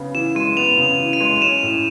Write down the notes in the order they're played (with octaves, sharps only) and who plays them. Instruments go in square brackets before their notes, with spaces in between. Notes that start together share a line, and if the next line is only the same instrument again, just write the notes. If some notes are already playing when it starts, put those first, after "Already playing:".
Already playing: [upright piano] C#3 B3
[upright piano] E3 [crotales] E7
[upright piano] G#3 [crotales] D#7
[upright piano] B3 [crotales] F7
[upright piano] C#3
E3
[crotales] D#7
[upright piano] G#3
[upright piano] C#4 [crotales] E7
[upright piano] A2